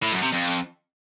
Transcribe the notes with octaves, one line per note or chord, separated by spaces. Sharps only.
A2
F#2
C3
F2